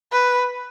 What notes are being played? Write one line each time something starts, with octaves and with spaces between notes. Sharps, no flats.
B4